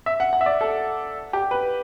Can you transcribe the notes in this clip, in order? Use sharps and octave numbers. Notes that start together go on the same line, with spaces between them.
E5
F#5
F#5
E5
D5
A4
G4
B4